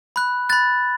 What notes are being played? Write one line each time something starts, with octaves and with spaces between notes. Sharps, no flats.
B5 F#6
B5 F#6 A6